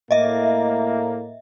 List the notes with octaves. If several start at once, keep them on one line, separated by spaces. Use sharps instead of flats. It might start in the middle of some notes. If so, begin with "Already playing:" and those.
A2 A#3 D#5 E5